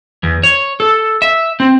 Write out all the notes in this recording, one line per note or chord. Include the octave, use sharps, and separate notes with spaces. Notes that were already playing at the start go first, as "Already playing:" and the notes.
E2
C#5
A4
E5
C4